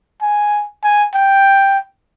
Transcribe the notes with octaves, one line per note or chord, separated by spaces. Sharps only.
G#5
G#5
G5